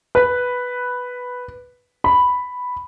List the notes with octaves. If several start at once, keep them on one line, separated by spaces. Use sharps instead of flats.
B4
B5